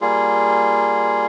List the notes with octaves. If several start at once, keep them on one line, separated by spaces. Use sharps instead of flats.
G3 A#3 F4 G#4